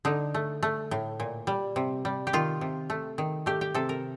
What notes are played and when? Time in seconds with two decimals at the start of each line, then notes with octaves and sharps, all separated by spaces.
0.05 D3 D#4
0.34 A3
0.63 A3
0.91 A2
1.20 A#2
1.47 G3
1.76 C3
2.05 G3
2.27 G4
2.33 D#3 F4
2.61 C3
2.90 A3
3.18 D#3
3.46 A3 G4
3.61 G4
3.74 C3 A4
3.89 A#4